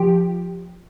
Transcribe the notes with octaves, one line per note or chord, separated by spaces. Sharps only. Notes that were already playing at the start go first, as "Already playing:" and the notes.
Already playing: F3 G4